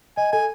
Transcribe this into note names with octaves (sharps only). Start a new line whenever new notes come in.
D#5 G#5
A4 G#5